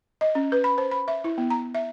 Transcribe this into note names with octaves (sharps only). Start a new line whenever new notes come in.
D#5
C#4
B4
B5
C5
B5
E5
E4
B3
A#5
E5